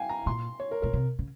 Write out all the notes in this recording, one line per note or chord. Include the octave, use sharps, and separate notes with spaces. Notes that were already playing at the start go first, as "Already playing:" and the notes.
Already playing: F5 G5 G#5
A#5
A#2 C6
C#5
A#4
A#2 A#4
C3
C#3